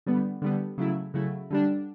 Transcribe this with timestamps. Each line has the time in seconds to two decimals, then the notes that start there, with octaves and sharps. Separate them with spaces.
0.06 D3 G3 B3
0.42 D3 G3 B3
0.77 C#3 F#3 A3 E4
1.14 C#3 F#3 A3 E4
1.50 D3 G3 D4